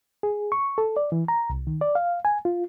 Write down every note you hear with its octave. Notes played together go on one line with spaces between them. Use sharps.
G#4
C#6
A4
D5
E3
A#5
C2
D#3
D5
F5
G#5
F4